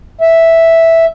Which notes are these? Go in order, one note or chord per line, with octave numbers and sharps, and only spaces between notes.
E5